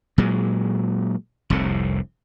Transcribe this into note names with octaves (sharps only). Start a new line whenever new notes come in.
A#2 F#3 G#3
F1 C2 A2 C3